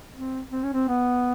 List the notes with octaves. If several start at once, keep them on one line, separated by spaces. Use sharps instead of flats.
C4
C4
C#4
C4
B3